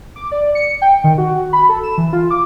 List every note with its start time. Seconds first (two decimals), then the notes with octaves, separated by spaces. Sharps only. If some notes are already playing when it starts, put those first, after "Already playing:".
0.16 D6
0.32 D5
0.55 C#7
0.82 G5
1.04 D#3
1.18 F#4
1.53 B5
1.69 A4
1.83 E7
1.98 E3
2.13 F4
2.30 D6